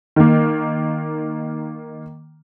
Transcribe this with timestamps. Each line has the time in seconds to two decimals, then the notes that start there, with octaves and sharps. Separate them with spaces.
0.16 D#3 A#3